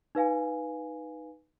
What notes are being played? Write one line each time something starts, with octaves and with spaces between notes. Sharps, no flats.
D#4 B4 F5 G#5